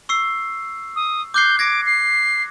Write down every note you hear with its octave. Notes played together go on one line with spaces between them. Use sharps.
C#6 E6 C7
D#6
D6 F#6 G6 C7
D6 G#6 A#6 C#7
C7